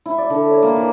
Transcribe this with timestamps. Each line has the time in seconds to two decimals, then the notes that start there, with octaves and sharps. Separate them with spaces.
0.06 E4
0.18 D5
0.30 D3
0.50 C#5
0.63 A#3
0.76 E3